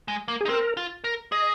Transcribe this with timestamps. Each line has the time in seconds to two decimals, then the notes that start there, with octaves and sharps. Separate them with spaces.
0.08 G#3
0.28 A#3
0.41 G#4
0.45 D#4
0.49 C4 A#4
0.77 F4
1.04 A#4
1.32 G#4 D#5